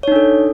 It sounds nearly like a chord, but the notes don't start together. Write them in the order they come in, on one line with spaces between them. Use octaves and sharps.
C#5 D#4 D4 A4